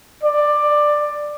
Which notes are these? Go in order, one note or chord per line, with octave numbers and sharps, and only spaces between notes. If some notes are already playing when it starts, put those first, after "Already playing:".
D5